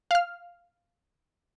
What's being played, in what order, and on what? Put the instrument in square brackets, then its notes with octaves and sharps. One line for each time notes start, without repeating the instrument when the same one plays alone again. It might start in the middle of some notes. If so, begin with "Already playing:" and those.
[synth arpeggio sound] F5 F6